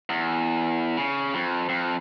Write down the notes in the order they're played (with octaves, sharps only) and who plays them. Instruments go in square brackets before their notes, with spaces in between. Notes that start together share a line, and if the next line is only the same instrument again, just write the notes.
[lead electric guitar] E2
C#3
F2
F2